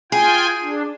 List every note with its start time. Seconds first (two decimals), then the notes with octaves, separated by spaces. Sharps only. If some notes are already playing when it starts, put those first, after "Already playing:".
0.12 F4 G#4 G5 G#5
0.63 D4